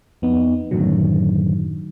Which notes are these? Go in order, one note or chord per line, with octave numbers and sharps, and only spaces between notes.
F2 B3 D#4
F#2 A2 D3 D#3 F#3